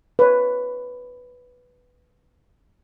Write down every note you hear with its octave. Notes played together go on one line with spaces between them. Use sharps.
B4 C#5